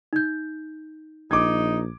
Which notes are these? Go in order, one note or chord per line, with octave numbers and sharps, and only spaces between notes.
D#4 G6
A#1 D#4 D6 G#6